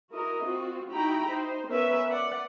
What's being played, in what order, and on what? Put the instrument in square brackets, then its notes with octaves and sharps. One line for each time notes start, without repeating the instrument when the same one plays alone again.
[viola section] E4 F#4 A#4 D#5
C4 F4 F#4
D#4 E4 F#4 G5 A#5 B5
D#4 C5
B3 C#4 A#4 B4 E5
B4 D5 F#5